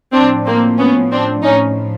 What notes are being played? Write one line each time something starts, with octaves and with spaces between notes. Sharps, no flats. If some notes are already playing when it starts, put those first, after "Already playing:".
A2 F3 C4 D4
A#3 C4
B3 C#4
C4 D4
A2 F3 C#4 D#4